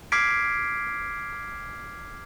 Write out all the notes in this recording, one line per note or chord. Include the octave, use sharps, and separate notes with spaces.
D6 F6 G#6 B6 C7 D7